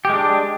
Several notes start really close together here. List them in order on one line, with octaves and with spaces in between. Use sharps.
G4 G#3 D4